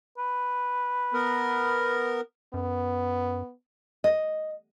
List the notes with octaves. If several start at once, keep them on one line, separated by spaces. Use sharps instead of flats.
B4
B3 A#4
F#2 B3
D#5